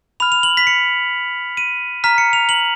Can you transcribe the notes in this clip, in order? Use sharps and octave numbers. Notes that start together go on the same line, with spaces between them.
B5 F6 F7
F7
F#7
B6
C#7
D#7
A#5 F6 B6
C#7
F7
F#7